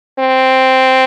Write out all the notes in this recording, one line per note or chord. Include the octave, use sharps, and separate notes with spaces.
C4